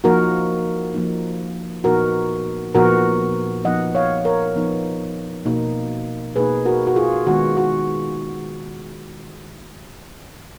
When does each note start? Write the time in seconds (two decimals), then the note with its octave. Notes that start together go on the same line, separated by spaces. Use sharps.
0.04 F3 A#3 D#4 F#4 A#4
0.94 F3 A#3 D#4
1.84 A#2 F3 B3 D#4 F#4 A#4
2.75 A#2 F3 B3 D#4 F#4 A#4
3.65 F3 B3 D#4 D#5 F#5
3.95 C#5 F5
4.25 A#4 C#5
4.56 F3 B3 D#4
5.45 B2 A#3 D#4
6.36 B2 A#3 D#4 G#4 B4
6.65 F#4 A#4
6.87 F#4
6.96 F4 G#4
7.27 D#3 G#3 B3 F#4
7.57 F#4